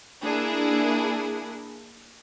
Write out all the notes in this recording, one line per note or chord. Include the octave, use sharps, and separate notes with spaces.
A#3 D4 E4 G#4